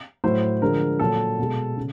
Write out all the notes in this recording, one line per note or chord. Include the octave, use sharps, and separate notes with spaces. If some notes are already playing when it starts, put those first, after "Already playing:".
A2 F#3 C5
D3 F3 G#3 A#4
A#2 F#3 A4
B2 G#3
C#3